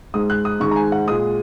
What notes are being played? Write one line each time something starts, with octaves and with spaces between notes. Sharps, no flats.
G#2 G#3 D#6
F#6
D#6
G#2 D#3 G#3 C#6
A#5
G#5
F#5
A#2 G#3 D#6